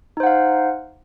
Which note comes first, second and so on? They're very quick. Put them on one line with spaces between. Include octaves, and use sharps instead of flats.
D#4 C5 F#5 F5